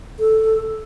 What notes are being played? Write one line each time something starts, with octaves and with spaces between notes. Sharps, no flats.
A4